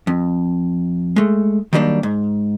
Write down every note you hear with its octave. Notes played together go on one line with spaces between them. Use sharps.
F2
G#3 A3
D#3 F#3 G3 A#3 D4
G#2